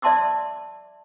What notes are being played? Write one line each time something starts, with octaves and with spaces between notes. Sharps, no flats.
D5 E5 A5 C6 D6 E6